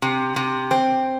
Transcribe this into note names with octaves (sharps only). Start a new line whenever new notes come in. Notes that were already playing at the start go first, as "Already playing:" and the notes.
C3
C3
C4